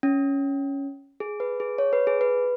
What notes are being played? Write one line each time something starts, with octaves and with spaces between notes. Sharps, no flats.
C#4
G#4
B4
G#4
C#5
B4
G#4
B4